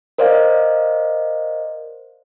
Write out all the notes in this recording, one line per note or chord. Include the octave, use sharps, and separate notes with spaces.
A#4 C5 D5 D#5 F5